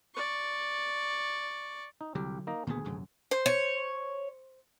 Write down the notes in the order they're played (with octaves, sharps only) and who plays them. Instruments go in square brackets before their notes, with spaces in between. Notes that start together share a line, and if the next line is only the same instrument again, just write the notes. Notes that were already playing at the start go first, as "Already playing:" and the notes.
[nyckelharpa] D5 C#6
[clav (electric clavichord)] D#4
[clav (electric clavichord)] C2 G4 G5 [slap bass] D3 F#3
[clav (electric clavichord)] A#3 D#4 A#5
[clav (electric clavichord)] D2 G#4 [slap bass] A#2 D#3 B3
[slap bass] D#1 F#2 C3
[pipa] C5
[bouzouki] C#5